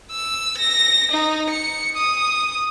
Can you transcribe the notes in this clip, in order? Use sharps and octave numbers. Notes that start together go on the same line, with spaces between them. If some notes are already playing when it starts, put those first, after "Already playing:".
E6
A#6
D#4
C#7
D#6